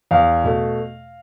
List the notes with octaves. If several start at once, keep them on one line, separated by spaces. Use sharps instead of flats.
E2 F5
B2 A3